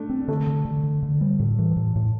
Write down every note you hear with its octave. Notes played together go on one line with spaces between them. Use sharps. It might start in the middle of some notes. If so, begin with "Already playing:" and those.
Already playing: A3 D4
C4
D3 A3
D3
D3
D3
D3
G3
A2
E3
A2
A2